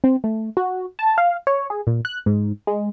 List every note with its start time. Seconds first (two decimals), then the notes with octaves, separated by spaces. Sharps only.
0.04 C4
0.24 A3
0.57 F#4
0.99 A5
1.18 F5
1.47 C#5
1.70 G#4
1.87 A#2
2.05 F#6
2.26 G#2
2.67 G#3